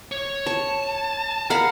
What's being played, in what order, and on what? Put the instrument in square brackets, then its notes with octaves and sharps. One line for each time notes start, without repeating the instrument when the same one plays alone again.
[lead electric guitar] C#5
[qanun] C#5 [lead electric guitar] A5
[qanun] A#4 F5 B5 [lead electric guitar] F#5